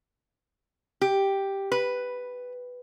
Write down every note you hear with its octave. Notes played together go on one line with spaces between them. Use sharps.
G4
B4